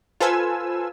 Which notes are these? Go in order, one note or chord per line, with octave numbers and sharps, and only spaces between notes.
F4 A4 B4 C5 G#5 E6